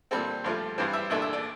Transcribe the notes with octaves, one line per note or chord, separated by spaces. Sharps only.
A#2 G3 C4 A4
G2 F3 A3
G2 E3 G3 C4 C5
E5
C2 A#2 A3 D4 E5
E5
D5